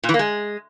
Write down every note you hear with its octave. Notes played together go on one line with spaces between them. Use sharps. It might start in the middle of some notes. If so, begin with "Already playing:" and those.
A#2
E3
A#3
G#3